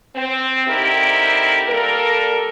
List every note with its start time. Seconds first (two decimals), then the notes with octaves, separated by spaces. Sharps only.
0.16 C4
0.67 D3 C4 D#4 E4 G4 A#4
1.69 G3 A#3 A4 A#4